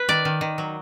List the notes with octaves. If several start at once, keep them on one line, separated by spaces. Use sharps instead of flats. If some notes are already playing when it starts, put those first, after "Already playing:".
Already playing: B4
D#3 D5
D#3
D#3
F#3